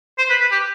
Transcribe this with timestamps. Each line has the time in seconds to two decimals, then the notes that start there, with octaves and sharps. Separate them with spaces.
0.18 C5
0.30 B4
0.41 B4
0.52 G4